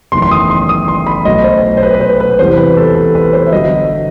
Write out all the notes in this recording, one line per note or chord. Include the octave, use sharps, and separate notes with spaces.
F#1 E2 D#3 A3 C6
C6
D#6
C6
D#6
C6
B5
B1 B2 A3 D#5
C5
C5
B4
B4
C5
B4
E1 E2 C3 E3 G3 C5
B4
A4
A4
B4
C5
E5
G1 G2 F#3 D#5